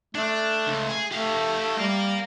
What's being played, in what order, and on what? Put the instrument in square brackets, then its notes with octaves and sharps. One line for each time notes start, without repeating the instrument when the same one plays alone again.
[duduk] A3 [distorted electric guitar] D4
[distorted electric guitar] C#2
G#4
[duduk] A3 [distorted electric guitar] G4 F5
[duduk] G3 [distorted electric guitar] A#4 F5